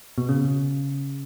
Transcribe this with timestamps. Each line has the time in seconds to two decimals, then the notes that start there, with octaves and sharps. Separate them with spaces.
0.18 B2
0.29 C#3